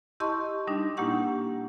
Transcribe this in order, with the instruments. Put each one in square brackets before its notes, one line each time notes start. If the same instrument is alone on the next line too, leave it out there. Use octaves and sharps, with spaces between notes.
[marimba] E4 G4 D#5 A5 C6 C#6
G3 D4 D#4
A#2 A#3 E4 G4 F#5 C#6